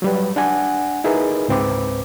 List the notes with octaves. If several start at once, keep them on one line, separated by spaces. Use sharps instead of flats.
F#3 G3 B4
D4 F#5 G#5
D#4 E4 G#4 A#4 B4
C#2 G#2 C4 B4 D6